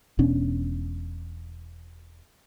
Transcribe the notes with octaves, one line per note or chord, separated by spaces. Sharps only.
E1 B2 C#4 D4